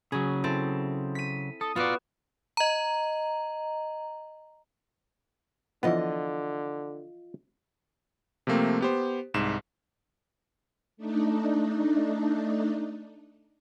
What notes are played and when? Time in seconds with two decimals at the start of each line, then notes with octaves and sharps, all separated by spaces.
0.12 C#3 F#3 G#4
0.44 C4 E4 A4
1.15 B6 D#7
1.61 A4 D#6
1.76 B3 F4 F#4 D5
2.57 D#5 A#5
5.83 D3 E3 F3 B3 F4 D#5
8.47 C3 F3 A3 A#3 C4
8.81 B3 G4 C5
9.34 C2 G#2 E7
10.97 A3 D4 D#4